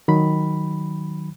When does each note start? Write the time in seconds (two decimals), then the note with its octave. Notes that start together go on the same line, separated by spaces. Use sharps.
0.08 D#3 F#3 B5